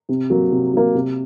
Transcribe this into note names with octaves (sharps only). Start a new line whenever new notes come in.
C3
F#3 A#3
C3
F#3 A#3
C3